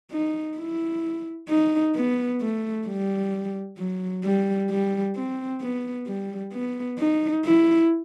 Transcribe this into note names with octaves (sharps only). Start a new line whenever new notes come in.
D#4
E4
D#4
B3
A3
G3
F#3
G3
G3
C4
B3
G3
B3
D#4
E4